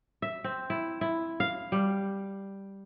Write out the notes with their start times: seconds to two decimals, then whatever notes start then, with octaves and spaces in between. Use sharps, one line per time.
0.22 E5
0.44 C4
0.70 E4
1.01 E4
1.40 F5
1.72 G3